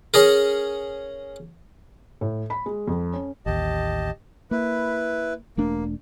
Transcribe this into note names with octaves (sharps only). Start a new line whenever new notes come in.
C#4 G#4 A#4
A2
B5
G#3
F2
C#4
A1 D#2 G4 D#5 A5
A#3 E4 B4
E1 A3 A#3 D4